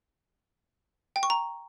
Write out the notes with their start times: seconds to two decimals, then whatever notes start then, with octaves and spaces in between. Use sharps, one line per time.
1.16 G5
1.23 C#6
1.30 A#5